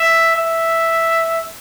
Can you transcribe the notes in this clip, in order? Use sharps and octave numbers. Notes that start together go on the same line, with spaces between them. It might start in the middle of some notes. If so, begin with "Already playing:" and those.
Already playing: E5
E5